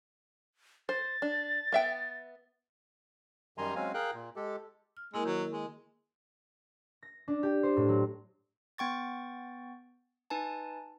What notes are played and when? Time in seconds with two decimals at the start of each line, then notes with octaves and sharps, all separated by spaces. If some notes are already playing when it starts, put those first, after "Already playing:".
0.89 C5 A6
1.22 D4
1.72 B3 E5 G5
3.58 F#2 D#3 G3 G#5 A#5 C6
3.75 F#3 G#3 C4 C#4 F5 G#5
3.94 G#4 A#4 F5 G5 F#6
4.14 A#2
4.36 G#3 G4 A4
4.97 F6
5.14 G#3 A#3 E4 A#4
5.25 D#3 F#3
5.51 G#3
7.03 A#6
7.28 D4
7.43 G4
7.63 C5
7.77 A2
7.89 F#3
8.78 B3 G5 C#6 A6
10.30 D#4 B4 G#5 A5